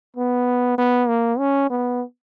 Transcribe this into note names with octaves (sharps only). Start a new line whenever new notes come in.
B3
B3
A#3
C#4
B3